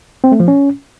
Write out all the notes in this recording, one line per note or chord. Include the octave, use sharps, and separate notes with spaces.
C4
A3
F3
C#4